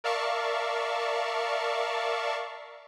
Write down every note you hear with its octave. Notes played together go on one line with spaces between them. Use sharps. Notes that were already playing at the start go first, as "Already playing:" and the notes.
A#4 D5 E5 F5 A5 C#6